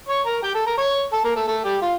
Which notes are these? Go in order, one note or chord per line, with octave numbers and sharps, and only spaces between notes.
C#5 C#6
A#4 A#5
G4 G5
A4 A5
A#4 A#5
C#5 C#6
A4 A5
A#3 A#4
A3 A4
A3 A4
G3 G4
F4